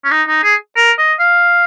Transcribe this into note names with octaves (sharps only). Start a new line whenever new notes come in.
C#4
D#4
D#4
G#4
A#4
D#5
F5